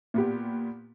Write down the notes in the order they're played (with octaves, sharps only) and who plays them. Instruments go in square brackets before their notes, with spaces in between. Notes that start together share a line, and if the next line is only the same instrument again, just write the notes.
[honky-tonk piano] A#2 B3 G4